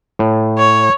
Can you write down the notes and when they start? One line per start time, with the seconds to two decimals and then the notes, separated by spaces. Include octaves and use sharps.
0.19 A2
0.58 C#5